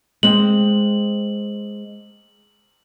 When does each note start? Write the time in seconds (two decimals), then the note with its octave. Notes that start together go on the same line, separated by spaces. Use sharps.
0.23 G#3 C4 F#7